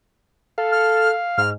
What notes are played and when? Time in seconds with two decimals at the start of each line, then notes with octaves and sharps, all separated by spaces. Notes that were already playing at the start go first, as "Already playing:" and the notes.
0.58 A4 F5
0.72 F6
1.38 G#2 F6